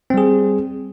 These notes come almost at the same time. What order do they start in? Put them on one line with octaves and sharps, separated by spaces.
C4 G3 G#4